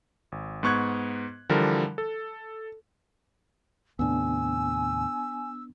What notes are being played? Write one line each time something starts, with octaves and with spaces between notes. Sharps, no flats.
G#1
G#2 B3 C#6 F#6 G#6
D3 E3 F3 G3 A#4
A4
D#2 A2 C3 B3 D4 G#5 E6